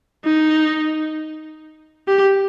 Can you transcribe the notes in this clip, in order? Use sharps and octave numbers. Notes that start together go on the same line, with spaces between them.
D#4
G4